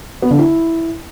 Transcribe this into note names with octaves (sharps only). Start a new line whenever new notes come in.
B3
D3
E4